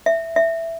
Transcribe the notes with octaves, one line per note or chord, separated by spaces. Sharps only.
E5
E5